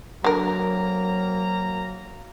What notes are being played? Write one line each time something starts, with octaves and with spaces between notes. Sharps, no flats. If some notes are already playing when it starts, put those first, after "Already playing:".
D3 F#3 A#3 C4 A#4 A#5